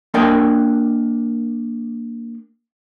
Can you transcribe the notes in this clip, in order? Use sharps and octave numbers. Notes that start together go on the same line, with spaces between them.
A#3 D4 A#4 D5 D#5 G5